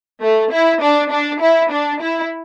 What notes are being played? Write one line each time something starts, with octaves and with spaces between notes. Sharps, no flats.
A3
E4
D4
D4
E4
D4
E4